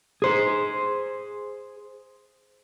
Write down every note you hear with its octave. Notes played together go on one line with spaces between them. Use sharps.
G#4 C5